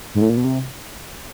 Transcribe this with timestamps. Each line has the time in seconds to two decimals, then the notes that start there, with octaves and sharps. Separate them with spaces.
0.15 G#2
0.22 A2
0.29 A#2
0.37 B2
0.44 C3